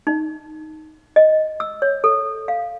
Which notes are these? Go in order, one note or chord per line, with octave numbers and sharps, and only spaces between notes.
D#4
D#5
E6
C#5
A4
F5